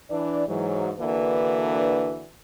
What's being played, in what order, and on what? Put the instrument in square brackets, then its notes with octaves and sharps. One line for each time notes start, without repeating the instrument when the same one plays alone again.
[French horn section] E3 D4 D5
G#2 E3 F#3
D3 E3 A#3 D4 F#4 B4